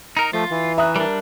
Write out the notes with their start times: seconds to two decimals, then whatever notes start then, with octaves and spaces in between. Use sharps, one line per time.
0.17 D#4 A#4
0.33 F3 A3 F4
0.51 E3
0.78 E5 A#5 D#6 F#6
0.96 G3 D4 A#4